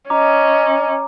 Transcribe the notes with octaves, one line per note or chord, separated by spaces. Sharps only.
C#4 D#5 A#5 D6